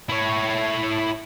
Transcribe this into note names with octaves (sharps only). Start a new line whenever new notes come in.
E4 C#5